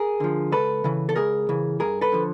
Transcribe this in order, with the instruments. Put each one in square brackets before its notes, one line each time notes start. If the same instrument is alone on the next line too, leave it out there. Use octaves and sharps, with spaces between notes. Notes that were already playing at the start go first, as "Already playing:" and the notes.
Already playing: [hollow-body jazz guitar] G#4 A#4
D3 F3
C#2 A4 B4
C#3 E3
A4
C#2 G#4 A#4
C#3 E3
G2 G#4 A#4
A4 B4
D3 F3